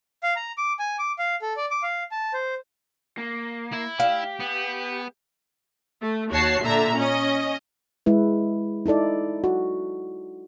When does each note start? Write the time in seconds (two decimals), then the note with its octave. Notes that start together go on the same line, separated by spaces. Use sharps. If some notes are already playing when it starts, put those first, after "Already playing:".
0.23 F5
0.36 A#5
0.58 D6
0.79 G#5
0.99 D6
1.19 F5
1.42 A4
1.57 D5
1.71 D6
1.83 F5
2.11 A5
2.33 C5
3.18 A#3
3.73 E4
4.00 G4 F5
4.40 B3
6.02 A3
6.33 D#2 F#4 C#5 A5 C7
6.63 A#2 D3 E5 A#5
6.97 C#4 D#5
8.06 G#3 E4 B4
8.86 D#4 E4 A4 D5
9.44 F#4